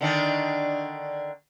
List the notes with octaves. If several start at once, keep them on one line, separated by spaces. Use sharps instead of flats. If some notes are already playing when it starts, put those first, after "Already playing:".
D3 D#3 D4